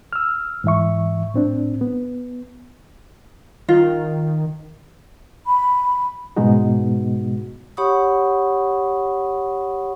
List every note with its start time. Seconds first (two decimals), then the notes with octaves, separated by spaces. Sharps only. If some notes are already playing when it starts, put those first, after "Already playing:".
0.13 E6 F6
0.64 G#2 E3 E5 C#6
1.34 A2 C4 D4
1.81 B3
3.69 D#3 F4
5.45 B5
6.36 G#2 B2 G#3 B3 D#4 F#4
7.77 G4 C#5 F#5 B5 C#6 D#6